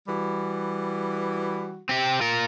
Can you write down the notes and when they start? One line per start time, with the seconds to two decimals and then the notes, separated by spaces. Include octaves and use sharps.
0.07 E3 G3 F#4
1.89 C4 G4
2.21 F4 A#4